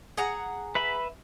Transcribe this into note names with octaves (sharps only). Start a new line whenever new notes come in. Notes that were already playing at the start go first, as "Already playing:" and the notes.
G#4 F#5 A#5
B4 E5 B5